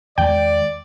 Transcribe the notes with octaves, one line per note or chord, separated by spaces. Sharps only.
E2 D#3 G#3 D5 G5